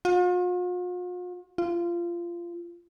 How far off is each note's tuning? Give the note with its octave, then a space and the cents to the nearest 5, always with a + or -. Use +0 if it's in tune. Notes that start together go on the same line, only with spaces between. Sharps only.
F4 +45
F4 -20